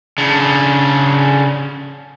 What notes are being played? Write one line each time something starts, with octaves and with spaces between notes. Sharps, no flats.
C#3 D4